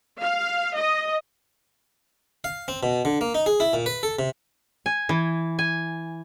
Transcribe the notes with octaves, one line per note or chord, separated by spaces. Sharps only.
F5
D#5
F5
C4
B2
D3
A#3
D#4
G#4
E4
A#2
B4
A4
C3
G#5
E3
G#5